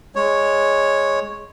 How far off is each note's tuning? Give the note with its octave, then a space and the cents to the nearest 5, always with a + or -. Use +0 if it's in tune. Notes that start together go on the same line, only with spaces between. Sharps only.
G#3 -5 C#5 -5